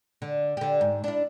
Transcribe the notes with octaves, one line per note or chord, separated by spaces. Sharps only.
D3
D3 G4
G#2
D4 E4